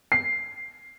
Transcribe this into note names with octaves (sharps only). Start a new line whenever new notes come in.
C7